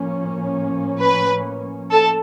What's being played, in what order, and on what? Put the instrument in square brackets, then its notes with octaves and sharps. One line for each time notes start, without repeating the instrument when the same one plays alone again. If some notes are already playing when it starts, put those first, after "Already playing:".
Already playing: [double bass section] A2 F3 A#3 C#4
[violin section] B4
A4